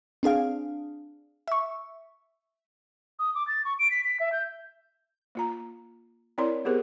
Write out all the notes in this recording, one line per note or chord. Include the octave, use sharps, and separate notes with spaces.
C4 D4 G#4 F5
E5 C#6
D#6
D6
A6
C#6
D7
B6
B6
E5
G6
A#3 F4 A#5
C4 E4 A#4 C#5 D5 C6
B3 G4 G#4 A#4 C5